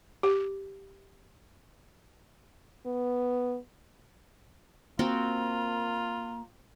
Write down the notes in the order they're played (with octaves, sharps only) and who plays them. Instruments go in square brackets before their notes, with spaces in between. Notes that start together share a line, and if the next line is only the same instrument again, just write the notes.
[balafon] G4
[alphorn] B3
[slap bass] A#3 [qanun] C4 F#4 G5 [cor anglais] F4 [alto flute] A#5